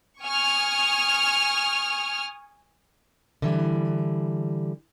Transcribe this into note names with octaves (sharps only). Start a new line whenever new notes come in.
G#5 C#6 D#6 F6
D3 E3 G3